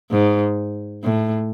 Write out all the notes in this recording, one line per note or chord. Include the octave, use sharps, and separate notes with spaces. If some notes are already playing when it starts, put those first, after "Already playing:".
G#2
A2